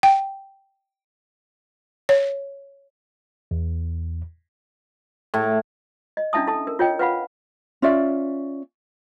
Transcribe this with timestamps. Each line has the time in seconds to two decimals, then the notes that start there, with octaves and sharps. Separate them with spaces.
0.03 G5
2.09 C#5
3.51 E2
5.34 A2
6.17 D#5
6.33 C#4 D4 E4 E5 A5 D#6
6.47 E4 A4 A5 D#6
6.67 A#4
6.79 F4 C#5 D#5 G5
6.99 B4 F5 F#5 B5
7.82 C#4 F4 D5 E5